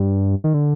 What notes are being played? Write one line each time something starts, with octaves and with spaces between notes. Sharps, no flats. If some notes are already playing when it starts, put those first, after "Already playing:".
Already playing: G2
D#3
D3